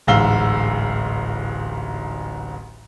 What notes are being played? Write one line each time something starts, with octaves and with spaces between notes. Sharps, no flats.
D1 A1 G#2 F5 E6 G7